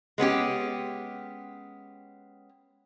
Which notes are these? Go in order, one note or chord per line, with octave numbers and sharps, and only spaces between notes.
G#3 B3 C#4 G4